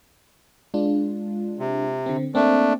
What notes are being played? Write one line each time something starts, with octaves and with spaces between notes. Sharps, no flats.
G#3 D4 F4
C3
D3 C4
A3 A#3 C4 D4